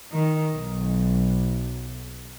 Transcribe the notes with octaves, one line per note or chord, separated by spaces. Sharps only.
D#3
B1